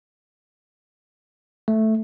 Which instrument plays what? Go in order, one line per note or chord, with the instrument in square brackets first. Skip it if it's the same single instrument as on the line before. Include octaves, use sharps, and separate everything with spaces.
[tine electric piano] A3